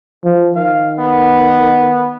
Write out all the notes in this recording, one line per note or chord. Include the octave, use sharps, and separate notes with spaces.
F3
D#3 F5
B3